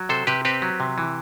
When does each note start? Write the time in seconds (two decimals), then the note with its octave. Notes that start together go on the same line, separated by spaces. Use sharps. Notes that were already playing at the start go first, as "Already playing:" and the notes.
Already playing: F#3
0.09 C3 A4 C5
0.27 C3 G4 B4
0.45 C4 G4 B4
0.62 F#3
0.80 C3
0.98 E3